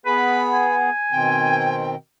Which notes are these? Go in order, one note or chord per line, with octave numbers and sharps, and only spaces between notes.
B3 G#4 B4 B5
G#5
B2 D#3 C4 G5